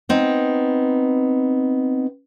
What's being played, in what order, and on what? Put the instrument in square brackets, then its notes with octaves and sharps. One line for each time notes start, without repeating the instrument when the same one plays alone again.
[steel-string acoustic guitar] B3 C4 D#4